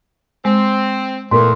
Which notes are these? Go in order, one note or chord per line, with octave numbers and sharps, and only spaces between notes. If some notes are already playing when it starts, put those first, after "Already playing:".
G#3 C4
E2 A#2 A3 A#3 C6